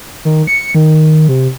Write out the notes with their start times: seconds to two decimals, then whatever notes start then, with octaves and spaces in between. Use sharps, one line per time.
0.25 D#3
0.47 C#7
0.75 D#3
1.29 C3